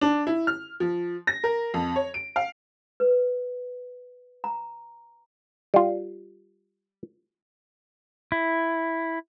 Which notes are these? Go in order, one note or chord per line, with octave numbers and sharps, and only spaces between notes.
D4
E4
F6
F3
A#6
A#4
F2
C#5
D7
F5
B4
A#5
G3 F4
E4